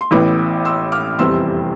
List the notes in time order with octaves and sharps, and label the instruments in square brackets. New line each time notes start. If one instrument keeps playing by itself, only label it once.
[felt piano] C6
A1 A2 E3 B3 B5 D6
C6 E6
D6 F6
F1 E2 C3 G3 C4 C6 E6